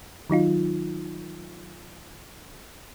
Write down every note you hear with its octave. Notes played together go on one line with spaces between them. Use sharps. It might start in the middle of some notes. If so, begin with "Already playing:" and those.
D#3 F#3 D#4 F4